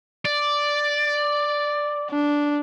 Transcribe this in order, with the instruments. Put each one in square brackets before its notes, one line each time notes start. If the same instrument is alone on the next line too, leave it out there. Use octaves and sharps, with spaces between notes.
[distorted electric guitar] D5
[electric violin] D4